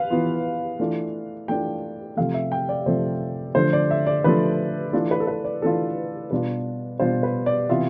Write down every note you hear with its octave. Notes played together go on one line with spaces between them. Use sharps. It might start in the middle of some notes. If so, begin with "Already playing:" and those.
Already playing: B4 F5
E3 B3 F4
E3 A3 D4 F4
E3 A3 D4 F4 G5
C3 F3 A3 F5
E5
G5
D5
C3 F3 A3 C5
D3 F3 A3 C5
D5
E5
D5
D3 F3 A3 B4
E3 A3 D4 F4 A4
B4
A4
B4
D5
E3 A3 D4 F4 A4
B2 G3 D4 F4 B4
B2 G3 D4 F4 C5
B4
D5
C3 E3 B3 F4 E5